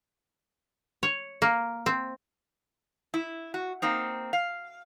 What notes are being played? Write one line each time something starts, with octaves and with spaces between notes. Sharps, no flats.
C#5
A#3
C4
E4
F#4
A#3 C4 D#4
F5